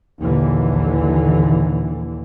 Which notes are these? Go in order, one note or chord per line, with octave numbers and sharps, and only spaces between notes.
A#1 D#2 A#2 D3 E3